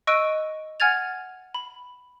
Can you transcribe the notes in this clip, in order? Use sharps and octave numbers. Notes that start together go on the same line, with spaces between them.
D#5 C#6 E6 F#6 D7 D#7
F#5 G#5 F6 G#6 A6 F7
B5